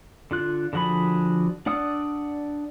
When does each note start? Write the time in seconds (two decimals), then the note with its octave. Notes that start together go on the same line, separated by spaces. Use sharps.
0.31 D3 F4 F#6
0.73 D3 F3 F#4 G#4 B5
1.66 D4 D5 F#5 D#6 E6